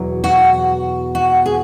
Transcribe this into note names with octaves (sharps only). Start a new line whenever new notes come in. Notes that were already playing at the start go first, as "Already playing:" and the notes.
Already playing: E2 B2 F#3
F#4
F#4
G#4